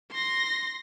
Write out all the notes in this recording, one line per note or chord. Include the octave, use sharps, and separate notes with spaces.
C6 A#6